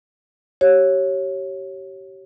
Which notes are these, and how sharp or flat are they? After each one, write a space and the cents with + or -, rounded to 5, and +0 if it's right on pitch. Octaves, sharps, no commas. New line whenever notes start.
G4 -30 C#5 -15